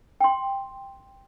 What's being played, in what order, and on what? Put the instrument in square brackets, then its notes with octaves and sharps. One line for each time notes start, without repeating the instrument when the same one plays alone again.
[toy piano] G5 C6